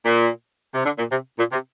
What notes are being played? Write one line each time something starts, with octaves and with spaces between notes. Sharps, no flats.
A#2
C3
D3
A#2
C3
A#2
C3